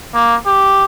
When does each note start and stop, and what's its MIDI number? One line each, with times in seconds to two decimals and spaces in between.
0.14 0.35 58
0.47 0.85 67